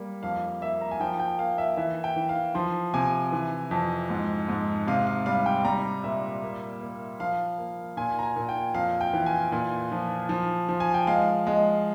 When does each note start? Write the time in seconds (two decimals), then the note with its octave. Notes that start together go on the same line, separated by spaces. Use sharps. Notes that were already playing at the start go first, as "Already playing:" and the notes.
Already playing: G3 A#3
0.23 F2 F5
0.62 A#3 E5
0.81 A#5
0.91 G#5
1.00 F3 G5
1.20 G5
1.39 A#3 F5
1.58 E5
1.77 E3 E5
2.04 G5
2.16 E3
2.29 F5
2.55 F3 C6
2.94 C3 G#5
3.32 E3
3.71 F2
4.10 G#2
4.49 G#2
4.87 C3 F5
5.07 F5
5.26 G3 F5
5.46 G5
5.64 G3 A#5
6.04 A#2 E5
6.42 A#3
6.81 A#3
7.20 F3 F5
7.58 A#3
7.97 A#2 G#5
8.19 A#5
8.23 G#5
8.36 A#2
8.49 G5
8.74 F2 F5
9.01 G5
9.13 E3
9.26 G#5
9.52 A#2
9.92 F3
10.29 F3
10.69 F3
10.80 G#5
10.94 G5
11.07 G#3 F5
11.47 G#3